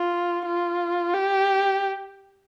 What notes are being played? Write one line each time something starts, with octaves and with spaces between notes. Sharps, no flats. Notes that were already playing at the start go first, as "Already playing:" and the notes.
Already playing: F4
F4
G4